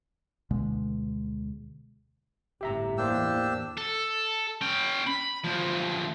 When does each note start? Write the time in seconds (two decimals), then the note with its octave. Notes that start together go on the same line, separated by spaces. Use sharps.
0.51 D2 B2 D3 G#3
2.61 G1 A2 G4 E5 A#5
2.98 E2 A2 A#3 D4 G4 C5 E6
3.78 A4
4.61 C#4 G5
5.07 B5
5.44 D2 F3